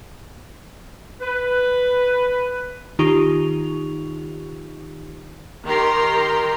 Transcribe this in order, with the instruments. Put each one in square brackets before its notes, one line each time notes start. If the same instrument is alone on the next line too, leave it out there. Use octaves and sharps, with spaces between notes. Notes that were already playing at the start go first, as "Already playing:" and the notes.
[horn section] B4
[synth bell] D#3 D#4 F4 G4 C#6 F7
[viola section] D#3 G4 A#4 A#5 C6